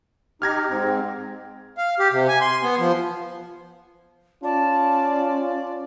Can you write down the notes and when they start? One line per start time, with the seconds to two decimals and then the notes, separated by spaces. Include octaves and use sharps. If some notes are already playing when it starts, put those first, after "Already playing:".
0.42 D#4 G4 F6 G#6 A#6
0.69 G#2 C4
1.77 F5
1.99 G4
2.12 C3
2.28 G#5
2.41 C6
2.63 B3
2.79 F3
4.43 C#4 F4 D5 A5